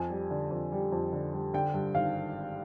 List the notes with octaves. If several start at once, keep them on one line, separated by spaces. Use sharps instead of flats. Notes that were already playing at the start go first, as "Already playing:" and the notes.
Already playing: F2 G#5
G3
D3
F2
G3
F2
D3
G3
D3 G5
G2
G#1 F5